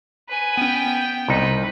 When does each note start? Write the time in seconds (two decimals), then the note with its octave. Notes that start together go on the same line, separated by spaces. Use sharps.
0.29 B4 G#5
0.57 B3 C#4 G5
0.86 B3
1.28 C2 D#4 B4